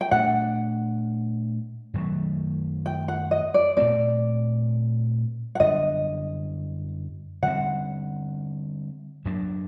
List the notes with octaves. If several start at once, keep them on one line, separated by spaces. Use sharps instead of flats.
G5
A#2 A3 D4 F#5
F#2 D#3 F#3 A3
G5
F#5
D#5
D5
A#2 A3 C4 D5
F#5
F#2 D3 G3 D4 D#5
D3 G3 C4 F#5
F#2 F#3 A#3 D4